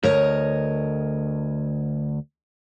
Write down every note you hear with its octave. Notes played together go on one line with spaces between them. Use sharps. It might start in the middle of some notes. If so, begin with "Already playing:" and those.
D2 A#4 C#5 D#5